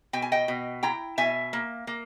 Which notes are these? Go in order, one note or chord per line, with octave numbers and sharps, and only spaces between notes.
B2 G5
G#5
D#5 G5
B2
E4 G5 A#5
B2 E5 G#5
A#3
A#3